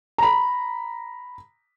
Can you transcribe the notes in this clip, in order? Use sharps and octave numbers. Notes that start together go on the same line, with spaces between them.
A#5 B5